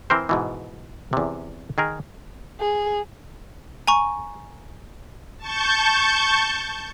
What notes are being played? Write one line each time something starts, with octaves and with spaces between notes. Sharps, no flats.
E3 C4 A#4 C5
G#2 B2 E3
E2 C3
D#3 G#4 A#4
G#4
G#5 A#5 C#6
A5 C#6 G6